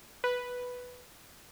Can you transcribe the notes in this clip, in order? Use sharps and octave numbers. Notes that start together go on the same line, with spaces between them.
B4